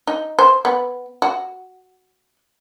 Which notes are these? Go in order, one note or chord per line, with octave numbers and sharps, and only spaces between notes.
D#4
C5
B3
F#4